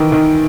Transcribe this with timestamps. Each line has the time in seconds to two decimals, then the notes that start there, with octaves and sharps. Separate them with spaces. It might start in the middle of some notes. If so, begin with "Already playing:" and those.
Already playing: D#3 E3
0.12 D#3